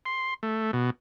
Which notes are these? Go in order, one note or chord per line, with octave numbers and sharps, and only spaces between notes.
C6
A3
B2